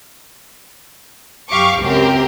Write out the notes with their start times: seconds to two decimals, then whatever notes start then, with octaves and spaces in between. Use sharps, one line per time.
1.49 F#2 G4 F5 C#6 D6
1.81 C#2 F#2 C4 G4 A#4